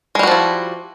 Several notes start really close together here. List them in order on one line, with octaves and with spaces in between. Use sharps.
G#3 G3 F#4 F3 E4